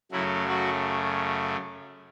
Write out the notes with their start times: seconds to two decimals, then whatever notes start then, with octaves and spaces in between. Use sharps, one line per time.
0.11 F#2 C#3 F#3 A3 E4
0.48 F#3 F#4